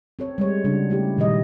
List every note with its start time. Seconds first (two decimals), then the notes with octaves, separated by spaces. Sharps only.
0.19 C4 A4 C#5
0.38 G3 G#3 C#5
0.64 C#3 G3 D4 F#4
0.90 A3 E4 G4
1.17 A#2 D#3 G3 D#5